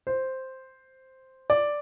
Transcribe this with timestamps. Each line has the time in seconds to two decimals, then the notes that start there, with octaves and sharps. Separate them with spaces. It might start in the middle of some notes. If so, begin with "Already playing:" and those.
0.07 C5
1.50 D5